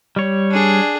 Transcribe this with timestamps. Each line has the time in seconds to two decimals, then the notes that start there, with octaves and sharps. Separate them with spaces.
0.16 G3 C#5
0.51 D4 G#4